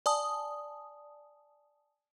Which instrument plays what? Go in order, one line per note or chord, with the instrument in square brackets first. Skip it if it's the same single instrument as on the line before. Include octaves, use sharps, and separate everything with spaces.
[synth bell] D5 G#5 A5 D#6